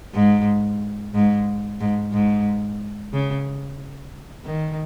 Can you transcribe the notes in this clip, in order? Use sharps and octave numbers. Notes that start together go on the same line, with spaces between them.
G#2
G#2
G#2
G#2
C#3
D#3